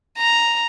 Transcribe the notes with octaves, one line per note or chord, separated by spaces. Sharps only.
A#5